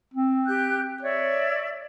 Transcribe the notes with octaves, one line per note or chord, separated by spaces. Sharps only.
C4
G4 F#6 G6
C#5 D5 E5